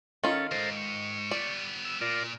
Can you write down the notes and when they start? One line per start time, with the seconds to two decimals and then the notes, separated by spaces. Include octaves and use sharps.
0.24 D#3 C#4 F4 A4
0.51 D#2 G#2 A4 A#4 C5
0.77 C#6
1.31 G3 B3 D5
1.85 E6
2.01 A#2 F4 A#4 D5